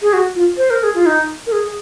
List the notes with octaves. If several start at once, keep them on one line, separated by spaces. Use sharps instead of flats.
G#4
F#4
F4
C5
A#4
G#4
F4
D#4
A#4
G#4